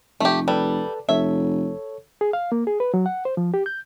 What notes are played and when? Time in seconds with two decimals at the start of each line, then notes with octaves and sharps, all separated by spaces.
0.20 F1 A3 G4
0.48 G3 A4 B4 A5
1.09 F1 A4 C#5 E5
2.21 G#4
2.33 F5
2.52 A#3
2.67 G#4
2.80 B4
2.94 F#3
3.06 F#5
3.25 C5
3.37 F3
3.54 G4
3.66 G6